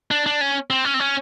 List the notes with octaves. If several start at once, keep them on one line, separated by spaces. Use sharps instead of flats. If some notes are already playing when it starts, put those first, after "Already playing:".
D4
D4
C#4
C4
C#4
C4
C#4